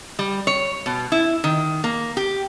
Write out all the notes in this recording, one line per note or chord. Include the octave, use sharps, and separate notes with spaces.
G3
C#5
B2
E4
D#3
A#3
G4